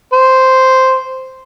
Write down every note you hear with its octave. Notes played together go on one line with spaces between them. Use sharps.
C5